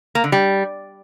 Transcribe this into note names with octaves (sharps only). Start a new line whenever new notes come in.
A#3
D3
G3